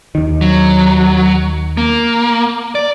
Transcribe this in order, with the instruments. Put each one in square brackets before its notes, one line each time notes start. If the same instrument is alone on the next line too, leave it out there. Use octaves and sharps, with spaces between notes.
[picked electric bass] D#2 D#3
[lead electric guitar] F#3
A#3
D5